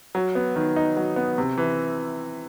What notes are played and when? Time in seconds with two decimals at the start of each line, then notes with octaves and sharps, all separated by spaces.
0.15 F#3
0.35 B3
0.56 D#3
0.76 D#4
0.96 F#3
1.16 B3
1.38 C3
1.58 E3